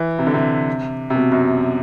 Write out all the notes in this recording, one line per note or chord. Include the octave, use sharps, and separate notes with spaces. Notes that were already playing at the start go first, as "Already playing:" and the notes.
Already playing: E3
C3
D3
C3
C3
B2
F#2